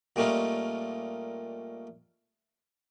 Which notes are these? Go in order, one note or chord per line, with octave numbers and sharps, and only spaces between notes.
A#2 G3 A3 C#4 D#4 F4